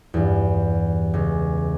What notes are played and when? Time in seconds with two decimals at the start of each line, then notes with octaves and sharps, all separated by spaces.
0.14 E2 G2
1.14 C#2